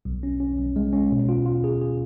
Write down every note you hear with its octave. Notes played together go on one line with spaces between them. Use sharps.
B1
C#4
C#4
B1
G#3
C#4
B2
F4
F4
G#4
G#4